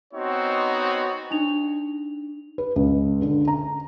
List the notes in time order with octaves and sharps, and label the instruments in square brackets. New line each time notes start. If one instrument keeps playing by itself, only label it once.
[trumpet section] B3 C4 D#4 F#4 C#5 D#5
[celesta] D4 D#4 F7
[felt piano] B4
C#2
D3
A#5